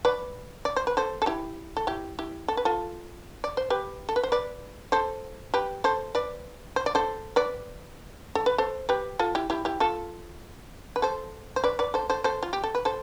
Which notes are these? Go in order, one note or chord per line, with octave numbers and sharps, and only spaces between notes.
B4 D5
D5
C5
B4
A4 C5
A4
E4 G4
A4
E4 G4
E4 G4
A4
B4
F4 A4
D5
C5
G4 B4
A4
B4
C5
B4 D5
A4 C5
G4 B4
A4 C5
B4 D5
C5
D5
A4 C5
B4 D5
A4
B4
A4 C5
G4 B4
F4 A4
E4 G4
E4 G4
E4 G4
F4 A4
B4
A4 C5
C5
B4 D5
B4 D5
A4 C5
A4 C5
A4 C5
F4
G4
A4
B4
A4 C5